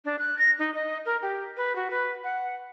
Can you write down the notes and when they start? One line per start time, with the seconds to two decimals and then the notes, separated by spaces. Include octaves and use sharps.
0.05 D4
0.19 F#6
0.38 A#6
0.59 D#4
0.75 D#5
1.06 A#4
1.22 G4
1.57 B4
1.76 F#4
1.90 B4
2.24 F#5